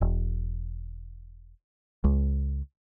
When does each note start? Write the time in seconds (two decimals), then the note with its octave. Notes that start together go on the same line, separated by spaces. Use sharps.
0.01 E1
2.04 C#2